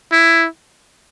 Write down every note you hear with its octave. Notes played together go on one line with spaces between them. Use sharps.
E4